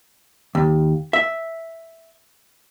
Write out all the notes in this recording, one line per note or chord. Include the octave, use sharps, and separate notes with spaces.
D#2
E5